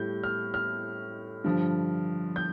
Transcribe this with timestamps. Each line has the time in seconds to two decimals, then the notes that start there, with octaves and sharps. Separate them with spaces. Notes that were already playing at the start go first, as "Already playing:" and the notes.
Already playing: A2 G3 G6
0.23 F6
0.54 F6
1.44 G2 D3 F3
2.36 G6